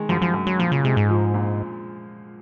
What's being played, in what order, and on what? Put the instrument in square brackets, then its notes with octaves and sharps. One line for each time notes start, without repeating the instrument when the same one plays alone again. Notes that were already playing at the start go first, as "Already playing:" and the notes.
Already playing: [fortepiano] D#3 G#3
[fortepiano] F#2 [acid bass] F3
[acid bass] F3
[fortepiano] F#2
[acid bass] F#3
[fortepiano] A#2 [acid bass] F3
[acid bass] C#3
[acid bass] C3 [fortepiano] G#3
[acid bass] G#2
[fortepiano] F3
A#2